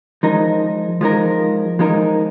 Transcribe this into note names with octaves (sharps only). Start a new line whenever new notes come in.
F3 G#3 D#4 A#4
F3 G#3 D#4 A#4
F3 G#3 D#4 A#4